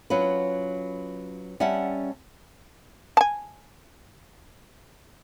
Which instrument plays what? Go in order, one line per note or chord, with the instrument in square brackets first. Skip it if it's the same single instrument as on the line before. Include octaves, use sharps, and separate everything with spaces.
[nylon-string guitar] F#3 C#4 F4 B4
G3 C#4 E5 F#5 A5
[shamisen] G#5 A5